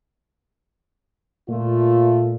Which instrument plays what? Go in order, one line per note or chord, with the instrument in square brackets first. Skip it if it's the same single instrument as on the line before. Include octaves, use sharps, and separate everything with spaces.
[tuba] A#2 [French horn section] A3 F4